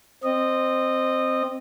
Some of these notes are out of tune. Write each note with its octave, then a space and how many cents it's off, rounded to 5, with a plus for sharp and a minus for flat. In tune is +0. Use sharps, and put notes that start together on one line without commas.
C4 +0 D#5 -15